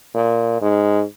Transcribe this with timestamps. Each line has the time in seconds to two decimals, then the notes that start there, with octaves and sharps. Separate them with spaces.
0.14 A#2
0.61 G#2